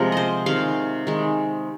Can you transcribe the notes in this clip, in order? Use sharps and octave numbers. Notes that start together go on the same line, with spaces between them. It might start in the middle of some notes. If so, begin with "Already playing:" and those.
Already playing: C3 F3 G#3 A#4
C5 D#5
C3 D#3 G#3 F5
D#3 G#3